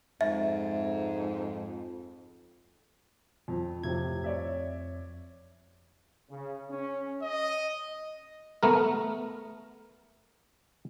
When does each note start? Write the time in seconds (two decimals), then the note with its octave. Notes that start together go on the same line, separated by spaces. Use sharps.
0.21 F2 G#2 E5
3.48 F2
3.84 F2 A2 C3 G#6
4.24 C#5 D5 E5
6.30 C#3
6.70 C#4
7.22 D#5
8.63 A3 B3 A#4